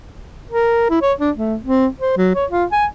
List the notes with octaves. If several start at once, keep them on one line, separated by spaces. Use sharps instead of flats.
A#4
E4
C#5
D4
A3
C4
C5
F#3
C#5
F4
G#5